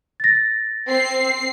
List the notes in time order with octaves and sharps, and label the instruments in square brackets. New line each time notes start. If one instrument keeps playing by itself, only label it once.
[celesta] A6 A#6
[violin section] C4 C7